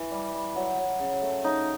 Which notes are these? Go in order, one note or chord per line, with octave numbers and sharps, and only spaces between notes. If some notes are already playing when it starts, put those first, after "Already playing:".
Already playing: E3
G3
G3
F#3
F#3
C#3
A3
C#3 D#4